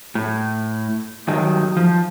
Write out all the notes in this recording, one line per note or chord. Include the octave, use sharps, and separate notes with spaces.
A2
G2 D#3 F#3
F3